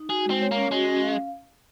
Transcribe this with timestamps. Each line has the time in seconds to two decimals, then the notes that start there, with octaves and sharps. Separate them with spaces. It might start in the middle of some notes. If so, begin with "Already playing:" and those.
Already playing: D#4
0.10 F#4 G#4
0.26 G#3 C4
0.41 C#5
0.52 A#3 C#4
0.72 G#3 F#4
0.87 C#4
1.03 F5